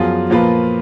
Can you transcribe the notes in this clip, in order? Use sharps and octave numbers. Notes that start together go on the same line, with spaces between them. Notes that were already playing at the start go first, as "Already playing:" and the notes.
Already playing: F#2 F3 B3 F4 G#4
A#2 F3 A#3 F4 B4